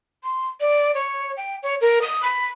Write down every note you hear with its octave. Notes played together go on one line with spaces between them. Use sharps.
C6
D5
C#5
G5
C#5
A#4
D#6
B5